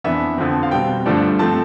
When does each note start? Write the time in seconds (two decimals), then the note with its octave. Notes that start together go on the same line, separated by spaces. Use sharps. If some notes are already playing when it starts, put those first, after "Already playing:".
0.04 F2 E3 B3 D4 E5
0.38 F2 D3 F3 C4
0.63 F5
0.71 B2 G3 C4 G5
1.06 G2 D3 F3 A3 D4
1.39 F3 A3 C4 A5